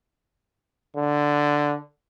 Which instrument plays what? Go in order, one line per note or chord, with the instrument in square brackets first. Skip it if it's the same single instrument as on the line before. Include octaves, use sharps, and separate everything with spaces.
[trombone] D3